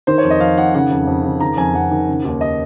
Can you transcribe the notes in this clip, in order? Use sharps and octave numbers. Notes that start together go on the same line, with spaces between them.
D#3 C5
C#5
F2
D#5
F2 F5
D#3 F#5
C#3 F#5
F2
F2
C#3
D#3 A#5
F2 G#5
F2 F#5
D#3
C#3
D#2
D#5